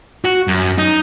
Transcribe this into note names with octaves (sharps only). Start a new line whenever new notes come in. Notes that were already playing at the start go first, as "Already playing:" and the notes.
F#4
F#2
D#4